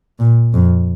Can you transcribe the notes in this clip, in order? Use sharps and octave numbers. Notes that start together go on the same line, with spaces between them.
A#2
F2